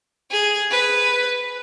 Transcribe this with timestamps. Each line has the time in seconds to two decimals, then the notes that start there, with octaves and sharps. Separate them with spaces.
0.31 G#4
0.71 B4